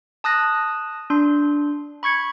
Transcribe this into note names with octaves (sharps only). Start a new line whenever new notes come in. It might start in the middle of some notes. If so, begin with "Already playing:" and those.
A5 D#6 F#6 A#6
D4 C6
B5 C#6 G#6 C#7